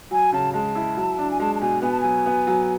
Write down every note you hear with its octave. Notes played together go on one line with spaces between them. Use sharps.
F#3 G#5
C#3 A5
G#3 A5
E4
F#3
D4
G#5
G#3 A5
A5
B2 G#5
B3 G#5
A5
F#3 G#5
B3
F#3